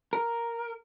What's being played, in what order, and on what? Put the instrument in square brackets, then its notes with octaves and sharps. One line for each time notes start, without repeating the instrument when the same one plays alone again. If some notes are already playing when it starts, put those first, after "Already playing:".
[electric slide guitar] A#4